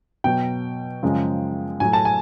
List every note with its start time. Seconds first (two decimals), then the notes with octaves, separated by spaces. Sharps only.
0.24 B2 F#3 G5
1.02 F#2 C#3 F3 G#3
1.80 A2 F#3 G#5
1.93 A5
2.05 G#5